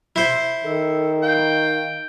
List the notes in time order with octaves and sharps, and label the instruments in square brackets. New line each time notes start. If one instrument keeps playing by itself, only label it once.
[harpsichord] E4 C5
[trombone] D#3 [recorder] A4
[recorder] F5 [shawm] G5